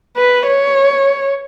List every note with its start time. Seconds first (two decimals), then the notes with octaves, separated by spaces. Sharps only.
0.17 B4
0.47 C#5